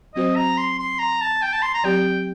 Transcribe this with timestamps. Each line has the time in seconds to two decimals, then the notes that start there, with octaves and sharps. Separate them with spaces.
0.14 F#3 C4 F#4 C5 D#5
0.36 A#5
0.58 C6
0.79 C6
0.99 A#5
1.21 A5
1.42 G5
1.53 A5
1.62 C6
1.74 A#5
1.84 F#3 C4 G4 D5 G5